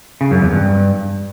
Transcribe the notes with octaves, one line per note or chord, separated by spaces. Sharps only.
C#3
F#2
E2
G2